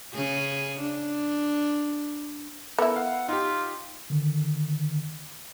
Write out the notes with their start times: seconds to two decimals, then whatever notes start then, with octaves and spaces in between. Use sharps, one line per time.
0.14 C#3 G#4
0.80 D4
2.78 B3 E4 A4 A#4 E6
2.96 F5 F#5
3.29 D#4 F4 G4
4.10 D3 D#3